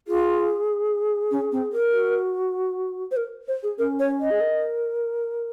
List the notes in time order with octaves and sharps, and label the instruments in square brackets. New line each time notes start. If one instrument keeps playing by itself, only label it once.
[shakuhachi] F4 [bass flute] G#4
[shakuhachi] C#4
C4
A#4
[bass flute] F#4
[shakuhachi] C5
A#4
C5
G#4
[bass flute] C#4 [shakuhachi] A#4
[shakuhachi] C#5
D#5
[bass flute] G#4
A#4